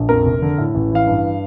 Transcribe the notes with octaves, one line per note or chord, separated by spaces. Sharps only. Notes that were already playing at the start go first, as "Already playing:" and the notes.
Already playing: A#1
F2 A#4
F1
D3
A2
A1
E3 F5
G2